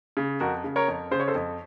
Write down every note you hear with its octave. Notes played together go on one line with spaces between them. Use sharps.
C#3
F2 F#4 A#4
C#3
A#4 C#5
F2
C#3 C5
C#5
A4 C5
F2